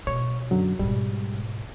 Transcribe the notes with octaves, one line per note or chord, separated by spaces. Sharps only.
B2 C#5
F#2 D3 F#3
G#2 B2 G3